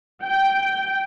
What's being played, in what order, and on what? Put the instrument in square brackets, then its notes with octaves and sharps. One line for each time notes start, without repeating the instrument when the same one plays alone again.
[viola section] G5